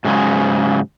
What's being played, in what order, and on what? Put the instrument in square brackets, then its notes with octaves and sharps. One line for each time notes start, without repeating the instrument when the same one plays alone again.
[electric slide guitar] G#2 C#3 F#3 G#3